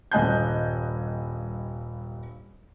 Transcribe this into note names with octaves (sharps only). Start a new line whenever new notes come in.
D#1 G2 D#5 G#5 F#6 G6